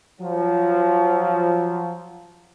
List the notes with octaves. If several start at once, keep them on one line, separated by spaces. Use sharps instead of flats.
F3 F#3